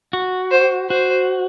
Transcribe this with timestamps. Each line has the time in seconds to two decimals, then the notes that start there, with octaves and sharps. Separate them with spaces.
0.13 F#4
0.51 C5
0.90 F#4 C5